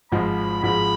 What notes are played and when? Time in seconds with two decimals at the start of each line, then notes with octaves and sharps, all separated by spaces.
0.12 G#1 G#2 F3 G#3 B5
0.63 G#1 G#2 F3 G#3 B5